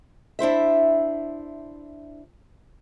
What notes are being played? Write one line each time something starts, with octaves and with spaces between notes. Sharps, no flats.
D4 E4 C5 E5